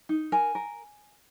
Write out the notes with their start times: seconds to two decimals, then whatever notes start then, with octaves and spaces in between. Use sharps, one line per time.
0.09 D#4
0.32 A#4 G#5
0.55 A#4